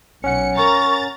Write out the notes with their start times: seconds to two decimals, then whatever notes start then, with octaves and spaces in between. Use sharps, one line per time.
0.24 B1 C#4 F#5 C#7
0.57 A#4 A#5 C#6 A6